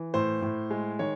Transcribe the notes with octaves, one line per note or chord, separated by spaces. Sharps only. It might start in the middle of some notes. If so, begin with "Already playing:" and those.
Already playing: E3
A2 C5
A2
G#3
D#3 C#5